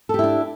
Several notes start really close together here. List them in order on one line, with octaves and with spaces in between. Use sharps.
A4 G4 E4 D4